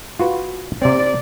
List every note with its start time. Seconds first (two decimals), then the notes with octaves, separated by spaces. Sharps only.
0.19 F4 F#4 B4
0.82 C3 C4 D5